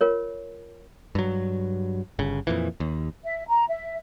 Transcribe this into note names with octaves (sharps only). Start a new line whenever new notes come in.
F4 A#4 C#5
G2 F#3
G1 C#3
F2 A#2 E3
D#2
E5
A#5
E5